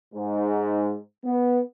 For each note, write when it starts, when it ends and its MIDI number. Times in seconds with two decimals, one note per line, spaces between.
0.14 0.95 44
1.24 1.60 59